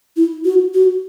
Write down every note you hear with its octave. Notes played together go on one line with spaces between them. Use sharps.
E4
F#4
F#4